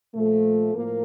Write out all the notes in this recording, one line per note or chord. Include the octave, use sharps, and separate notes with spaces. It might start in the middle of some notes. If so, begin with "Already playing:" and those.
A#2 F3 A3
A2 F3 A#3